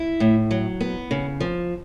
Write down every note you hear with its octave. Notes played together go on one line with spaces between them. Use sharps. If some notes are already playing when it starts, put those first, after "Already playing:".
Already playing: E4
A2
F#3
B3
C#3
F3